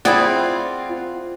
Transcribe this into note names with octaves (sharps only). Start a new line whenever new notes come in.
C4 E4 F4 G#4 D5 F#5